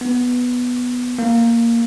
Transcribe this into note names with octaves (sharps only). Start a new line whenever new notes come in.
B3
A#3